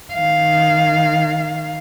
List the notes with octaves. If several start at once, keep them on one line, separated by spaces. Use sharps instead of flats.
D#3 F5